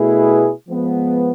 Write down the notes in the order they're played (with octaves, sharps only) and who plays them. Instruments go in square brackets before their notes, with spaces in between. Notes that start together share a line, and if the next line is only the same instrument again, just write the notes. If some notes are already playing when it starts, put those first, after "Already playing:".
Already playing: [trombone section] B2 A3 E4 G#4 B4
F3 G#3 B3